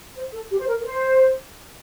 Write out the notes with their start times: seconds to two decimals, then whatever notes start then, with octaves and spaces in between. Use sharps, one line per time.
0.16 C5
0.33 A4
0.51 G4
0.59 C5
0.68 A#4
0.81 A#4
0.85 C5